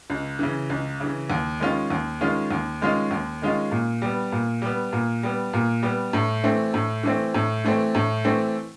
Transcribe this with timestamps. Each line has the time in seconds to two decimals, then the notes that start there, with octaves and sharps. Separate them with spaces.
0.10 C#2
0.39 C#3 E3
0.70 C#2
1.00 C#3 E3
1.30 D#2
1.60 D#3 G#3 C#4 F4
1.90 D#2
2.21 D#3 G#3 C#4 F4
2.51 D#2
2.81 D#3 G#3 C#4 F4
3.11 D#2
3.42 D#3 G#3 C#4 F4
3.72 A#2
4.02 G3 B3
4.32 A#2
4.62 G3 B3
4.93 A#2
5.23 G3 B3
5.54 A#2
5.83 G3 B3
6.13 A2
6.44 E3 A3 C4
6.74 A2
7.04 E3 A3 C4
7.34 A2
7.65 E3 A3 C4
7.95 A2
8.25 E3 A3 C4